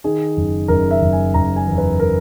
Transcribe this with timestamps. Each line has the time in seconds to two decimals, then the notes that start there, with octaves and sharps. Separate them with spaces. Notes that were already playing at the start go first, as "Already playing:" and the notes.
0.04 D#3 G#4
0.37 F#1
0.68 F#1 A#4
0.91 E5
1.01 F#1
1.13 G#5
1.34 F#1 A#5
1.56 G#5
1.67 E2
1.78 B4
1.99 A#4